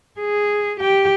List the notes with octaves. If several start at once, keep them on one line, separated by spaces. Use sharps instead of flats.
G#4
G4 G5